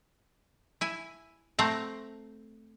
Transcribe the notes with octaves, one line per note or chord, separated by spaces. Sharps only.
E4 G#5
A3 C4 F#5 A#5